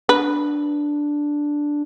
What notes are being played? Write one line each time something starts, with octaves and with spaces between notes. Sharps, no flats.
D4 B4